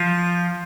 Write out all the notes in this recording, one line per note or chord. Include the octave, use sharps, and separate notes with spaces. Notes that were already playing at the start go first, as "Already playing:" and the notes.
Already playing: F3